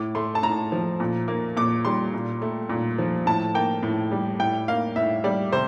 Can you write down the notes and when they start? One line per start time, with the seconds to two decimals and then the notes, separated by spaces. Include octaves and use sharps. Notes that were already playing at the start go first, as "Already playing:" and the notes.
Already playing: A2 D6
0.15 A3 C6
0.35 A5
0.43 A2 A#5
0.72 F3
1.00 A#2
1.28 A#3
1.57 A#2 D6
1.85 G3 C6
2.14 A#2
2.42 A3
2.69 A#2
2.98 F3
3.26 A2 A5
3.54 A#3 G5
3.83 A2
4.12 G3
4.39 A2 G5
4.68 A#3 F5
4.96 A2 E5
5.24 G3 D5
5.52 C3 C5